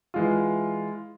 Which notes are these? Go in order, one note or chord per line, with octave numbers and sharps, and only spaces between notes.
E3 G#3 F4